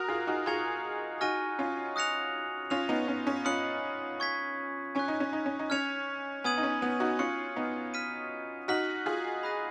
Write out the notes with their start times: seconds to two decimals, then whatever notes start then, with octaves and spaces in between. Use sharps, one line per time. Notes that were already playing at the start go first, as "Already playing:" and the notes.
Already playing: F#4 A#4 D#6 A#6 F7
0.08 F4 G#4
0.27 D#4 F#4
0.46 F4 G#4 A#5 C#6 G#6 C#7 F7
1.21 D#4 F#4 G#5 C#6 F6 A#6 D#7
1.59 C#4 F4
1.96 D#6 F#6 A#6 C#7 F7
2.70 C#4 F4 F6 A#6 F7
2.89 B3 D#4
3.08 C#4
3.27 C#4
3.45 C#4 F4 B5 D#6 F#6 C#7 F#7
4.20 C#6 G#6 B6
4.95 C#4 G#5 C#6 F#6
5.08 D#4
5.20 C#4
5.33 D#4
5.46 C#4
5.59 D#4
5.70 C#4 F6 G#6 C#7 F7
6.44 B3 G#5 D#6 G#6 D#7 F#7
6.58 D#4
6.63 C#4
6.82 B3
7.00 D#4 F#4
7.19 C#4 F4 C#6 F#6 C#7 F#7
7.56 B3 D#4
7.94 F6 B6 D#7
8.68 D#4 F#4 F6 B6 F#7
9.06 F4 G#4
9.43 B5 D#6 F#6 A#6 D#7